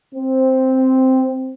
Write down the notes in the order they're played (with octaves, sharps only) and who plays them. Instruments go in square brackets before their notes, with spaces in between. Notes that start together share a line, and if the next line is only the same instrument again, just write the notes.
[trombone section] C4